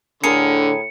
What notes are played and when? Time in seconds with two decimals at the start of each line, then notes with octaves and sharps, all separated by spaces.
0.24 A2 D3 G#4 A#4 C#7